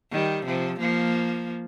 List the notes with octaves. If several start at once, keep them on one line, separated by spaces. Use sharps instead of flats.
D#3 G3
C3 F3
F3 A#3